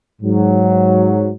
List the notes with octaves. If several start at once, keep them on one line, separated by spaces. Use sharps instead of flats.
G#2 F#3